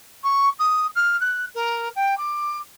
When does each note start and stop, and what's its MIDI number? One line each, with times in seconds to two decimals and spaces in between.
0.24 0.49 85
0.59 0.87 87
0.96 1.17 89
1.21 1.45 90
1.55 1.89 70
1.96 2.17 79
2.18 2.59 86